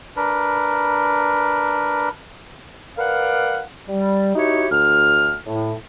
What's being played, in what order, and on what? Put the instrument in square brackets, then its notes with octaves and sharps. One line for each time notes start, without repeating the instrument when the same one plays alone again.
[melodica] D4 A#4 B4
[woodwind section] A#4 B4 D5 F5 F#5
G3
D#4 E4 F#4 G4 C#5
D2 F6
A2